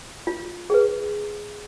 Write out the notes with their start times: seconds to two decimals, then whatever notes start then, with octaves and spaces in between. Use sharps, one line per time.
0.27 F4
0.70 G#4 B4